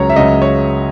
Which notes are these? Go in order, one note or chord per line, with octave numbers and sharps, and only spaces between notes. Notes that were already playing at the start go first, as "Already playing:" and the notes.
Already playing: C#2 C#3 F#3 C#5 A#5
E5
C#2 C#3 F#3 D#5
C#5